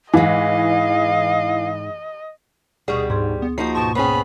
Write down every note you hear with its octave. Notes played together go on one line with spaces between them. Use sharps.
G#2 E3 G#3 D#5 F5
D2 B2 G3 G#4 C#6
G#2 G#4 C6
B3
F3 A#3 D#4 F#4 C7
G#2 B2 A5 C#6
B3 C#4 G#4 C5 G5 B5